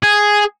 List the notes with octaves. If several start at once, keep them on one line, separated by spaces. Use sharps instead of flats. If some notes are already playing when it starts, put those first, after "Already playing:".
G#4